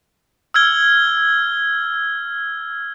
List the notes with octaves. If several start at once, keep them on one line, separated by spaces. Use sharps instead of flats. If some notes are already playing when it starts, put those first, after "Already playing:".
E6 F6 G#6 G7